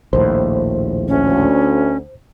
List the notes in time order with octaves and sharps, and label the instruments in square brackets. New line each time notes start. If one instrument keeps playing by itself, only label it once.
[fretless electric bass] A#1 D#2 A2 [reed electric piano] C5
[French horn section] D2 [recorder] C#4